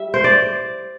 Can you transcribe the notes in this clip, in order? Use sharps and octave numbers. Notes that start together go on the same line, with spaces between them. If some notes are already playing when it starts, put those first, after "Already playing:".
Already playing: G3 E5
C5
D5